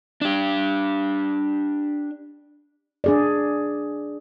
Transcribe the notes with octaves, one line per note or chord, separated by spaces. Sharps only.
D4 G4
D4 G#4 D5